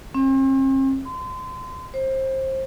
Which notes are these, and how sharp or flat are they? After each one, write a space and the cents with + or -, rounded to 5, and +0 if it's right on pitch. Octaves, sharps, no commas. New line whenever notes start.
C4 +45
C6 -30
C5 +25